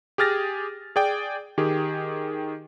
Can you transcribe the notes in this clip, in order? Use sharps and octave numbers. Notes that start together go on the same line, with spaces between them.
G4 G#4 F6 A6 A#6
G#4 D5 G5
D#3 G4 G#4